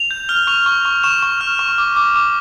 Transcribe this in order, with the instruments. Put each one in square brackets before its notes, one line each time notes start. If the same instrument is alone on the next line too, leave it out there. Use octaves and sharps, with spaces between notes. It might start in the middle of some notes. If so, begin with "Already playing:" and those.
Already playing: [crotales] F7
G6
F6 G7
C#6 F7
C#6
C#6
C#6 E7
C#6
F6
C#6
D6
D6
D6